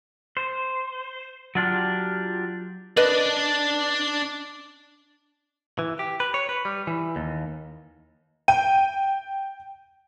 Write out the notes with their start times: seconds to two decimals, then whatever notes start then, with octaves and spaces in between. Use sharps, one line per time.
0.37 C5
1.55 F#3 D4 F4 G4
2.97 D4 B4 D5 D#5
5.79 E3
5.99 G4
6.20 B4
6.34 C#5
6.49 B4
6.65 G3
6.87 E3
7.16 D#2
8.48 G5 D#7